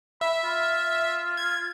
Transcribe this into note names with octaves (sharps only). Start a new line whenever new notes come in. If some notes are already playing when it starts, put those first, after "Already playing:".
E5 B5
F4
G#6